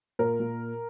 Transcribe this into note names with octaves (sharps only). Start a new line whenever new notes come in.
A#2 A#4
A#2